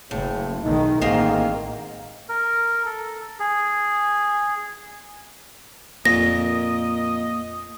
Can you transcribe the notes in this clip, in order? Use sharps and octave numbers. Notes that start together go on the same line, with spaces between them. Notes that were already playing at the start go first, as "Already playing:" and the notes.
F#1 A2 C#3
B1 D#3 G#3 D#4
A1 G#2 D#3 A#3 C4 D#5 F5
A#4
A4
G#4
F2 A#2 A#3 D#5 A#6